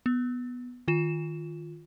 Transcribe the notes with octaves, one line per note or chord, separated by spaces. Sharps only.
B3
D#3 F4 E7